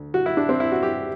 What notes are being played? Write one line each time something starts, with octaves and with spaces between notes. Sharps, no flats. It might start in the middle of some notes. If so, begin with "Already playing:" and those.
Already playing: D2
F#4
E4
D4
C4
E4
F#4
G4